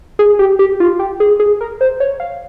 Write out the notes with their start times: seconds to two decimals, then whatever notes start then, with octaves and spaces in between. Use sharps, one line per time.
0.19 G#4
0.39 G4
0.59 G4
0.80 F4
0.99 G4
1.20 G#4
1.40 G#4
1.61 A#4
1.81 C5
2.00 C#5
2.20 F5